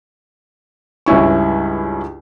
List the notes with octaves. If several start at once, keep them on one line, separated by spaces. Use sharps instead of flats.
C#2 G2 C#4 E4 C#6